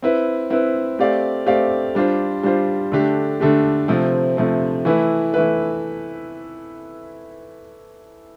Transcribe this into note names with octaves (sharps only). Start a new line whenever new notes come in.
C4 E4 B4
C4 E4 B4
A3 C4 G4 D5 F5
A3 C4 G4 D5 F5
G3 D4 F4 C5
G3 D4 F4 C5
D3 A3 D4 G4
D3 A3 D4 G4
C3 F3 A3 C4
C3 F3 A3 C4
E3 A3 E4 B4
E3 A3 E4 B4